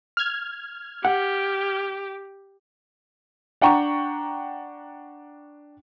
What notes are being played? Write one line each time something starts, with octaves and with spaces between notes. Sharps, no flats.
F6 G#6
G4 F#5
D4 F#5 G5 A#5 C#6